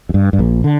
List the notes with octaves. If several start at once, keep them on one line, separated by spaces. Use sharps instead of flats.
F2
G2
G2
A#1 A#2
D3